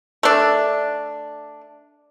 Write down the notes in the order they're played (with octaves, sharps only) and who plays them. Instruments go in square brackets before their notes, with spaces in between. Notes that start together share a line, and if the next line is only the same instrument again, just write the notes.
[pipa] A3 D4